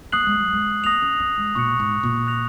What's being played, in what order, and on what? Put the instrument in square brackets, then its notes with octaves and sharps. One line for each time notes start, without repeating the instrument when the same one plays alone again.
[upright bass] A#3 [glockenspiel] D#6 F#6 C7 F#7
[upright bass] G#3
F#3
G#3
[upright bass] A#3 [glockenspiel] D#6 A#6 F7
[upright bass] C#4
C#4
G#3
[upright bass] A#2 [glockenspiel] C#6 F#6 C#7
[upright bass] G#2
A#2
[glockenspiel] D#6 F#6 A#6 F7